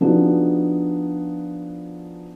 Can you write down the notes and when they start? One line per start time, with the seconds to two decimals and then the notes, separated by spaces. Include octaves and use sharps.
0.01 F3 B3 D4 D#4 F#4 G#4